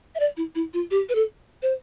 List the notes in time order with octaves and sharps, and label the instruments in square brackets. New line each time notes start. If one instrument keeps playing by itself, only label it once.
[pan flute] E5
D5
E4
E4
F4
G4
B4
A4
C5